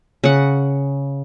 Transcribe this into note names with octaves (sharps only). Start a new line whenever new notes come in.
C#3 F#5